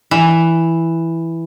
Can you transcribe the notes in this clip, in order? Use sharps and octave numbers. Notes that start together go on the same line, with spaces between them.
E3